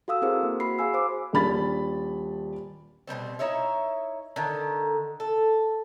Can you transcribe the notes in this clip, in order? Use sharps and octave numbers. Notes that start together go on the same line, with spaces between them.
F#4 A4 F5 D#6 E6
C4 E4 F#4 G#4 A#4 C5
A#3
F#4 B5 C7
G#4 F5 G#5 E6
C5 D6
D#1 D4 B5 A6
B2 D3 G3 C4
D#4 E4 C#5 E5
D3 D#3
A4